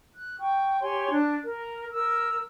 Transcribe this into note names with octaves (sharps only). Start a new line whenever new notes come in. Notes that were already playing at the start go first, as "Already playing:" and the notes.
F#6
G5 C#6
G4 C#5 G#5 C6
D4
A#4
A#4 E6